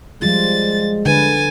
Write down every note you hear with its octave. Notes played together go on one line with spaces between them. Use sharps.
F3 G3 G#3 F4 A6
D3 B4 G#5 A6